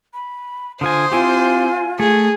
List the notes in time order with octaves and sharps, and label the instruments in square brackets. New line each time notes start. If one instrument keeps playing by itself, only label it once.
[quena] B5
[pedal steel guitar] D3 F4 G#5 [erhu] C5 [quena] D#6
[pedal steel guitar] C4 E4 G4 [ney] F4 [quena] G#5
[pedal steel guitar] A3 [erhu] G#4